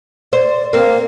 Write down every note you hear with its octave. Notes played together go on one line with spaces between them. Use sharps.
C5 D5
A#3 C4 A#4